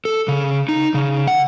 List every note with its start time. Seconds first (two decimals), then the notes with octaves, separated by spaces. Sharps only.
0.05 A4
0.28 C#3
0.69 D#4
0.94 C#3
1.27 F#5